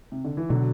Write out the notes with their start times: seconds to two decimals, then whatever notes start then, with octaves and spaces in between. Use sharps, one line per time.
0.12 C3
0.24 D3
0.37 E3
0.49 B2 D3 F#3